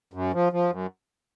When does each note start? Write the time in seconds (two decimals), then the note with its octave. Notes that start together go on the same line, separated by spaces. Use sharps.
0.14 F#2
0.33 F3
0.53 F3
0.71 F#2